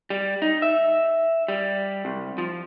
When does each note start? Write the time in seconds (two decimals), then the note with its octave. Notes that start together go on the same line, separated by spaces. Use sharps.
0.10 G3
0.42 D#4
0.62 E5
1.48 G3
2.05 C2
2.38 F3